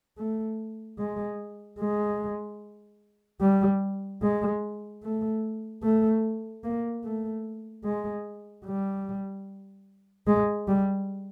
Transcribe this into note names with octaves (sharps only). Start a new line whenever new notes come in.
A3
G#3
G#3
G3
G#3
A3
A3
A#3
A3
G#3
G3
G#3
G3